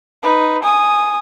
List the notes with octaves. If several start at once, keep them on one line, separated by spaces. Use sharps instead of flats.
D#4 B4
G#5 D#6